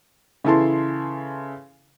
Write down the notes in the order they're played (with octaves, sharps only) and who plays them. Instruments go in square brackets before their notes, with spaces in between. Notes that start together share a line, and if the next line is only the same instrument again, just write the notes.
[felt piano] C#3 E3 E4 A4 A5 C6